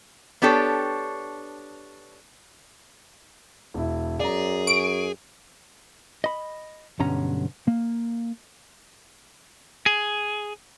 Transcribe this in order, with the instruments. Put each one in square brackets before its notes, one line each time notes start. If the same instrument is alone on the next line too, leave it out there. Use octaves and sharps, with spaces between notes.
[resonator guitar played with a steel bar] B3 D4 G4 A4 C#5
[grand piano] E1 E4
[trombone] F#2 [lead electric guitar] G#4 [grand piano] D5 A#5
[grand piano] C#6 [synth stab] D7
[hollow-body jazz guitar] D#5 B5
B1 G2 D3 C#4 A#5
A#3
[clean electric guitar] G#4